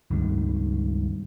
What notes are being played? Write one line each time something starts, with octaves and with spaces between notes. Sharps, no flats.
C#2 G2 D#3